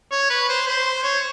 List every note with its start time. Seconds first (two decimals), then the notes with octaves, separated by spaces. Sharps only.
0.11 C#5
0.30 B4
0.49 C5
0.67 C5
1.03 C#5